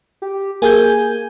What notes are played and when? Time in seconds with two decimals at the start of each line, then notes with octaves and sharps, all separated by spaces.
0.22 G4
0.62 A#3 G#4 G#5 G6